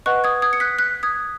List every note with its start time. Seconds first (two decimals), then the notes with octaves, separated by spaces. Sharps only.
0.06 B4 D#5 F#5 C#6 F#6
0.24 D#6 G#6
0.42 D#6 G#6
0.53 C#7
0.60 F#6 B6
0.79 F#6 B6
1.03 D#6 G#6